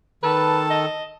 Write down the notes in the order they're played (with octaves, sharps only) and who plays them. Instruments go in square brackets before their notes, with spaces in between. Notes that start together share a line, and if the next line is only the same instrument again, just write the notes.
[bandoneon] D#3 A4 [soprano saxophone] B4 [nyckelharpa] A5
[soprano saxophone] D#5